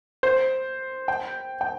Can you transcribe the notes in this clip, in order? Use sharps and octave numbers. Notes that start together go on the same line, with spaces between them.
C5
G5
G5